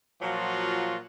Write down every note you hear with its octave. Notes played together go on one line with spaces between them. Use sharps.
A#2 F3 F#3 F4 F#4